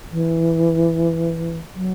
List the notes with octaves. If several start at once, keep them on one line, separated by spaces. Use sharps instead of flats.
E3
F#3